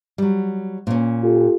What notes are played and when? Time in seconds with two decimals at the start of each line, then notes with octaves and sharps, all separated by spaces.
0.18 F#3 G3
0.87 A#2 C#4
1.23 F4 G4 A4